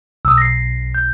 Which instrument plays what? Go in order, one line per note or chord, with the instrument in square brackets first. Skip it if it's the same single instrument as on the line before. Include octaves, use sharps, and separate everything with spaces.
[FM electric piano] B1 [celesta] D#6 E6
[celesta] A#6 C7
G6